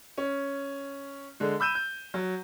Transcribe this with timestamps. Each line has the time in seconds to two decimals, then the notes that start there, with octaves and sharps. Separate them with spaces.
0.18 C#4
1.40 D3 G#3
1.60 B5 E6 G6 D#7 E7
1.75 G6
2.14 F#3